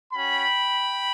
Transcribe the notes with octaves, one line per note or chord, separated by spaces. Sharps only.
C#4 F#4 G5 B5